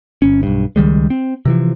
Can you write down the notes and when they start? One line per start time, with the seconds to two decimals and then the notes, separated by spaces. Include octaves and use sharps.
0.22 G1 C#4
0.43 B1 G2
0.76 C#2 D#3 G3 G#3
1.10 C4
1.45 C3 E3 F3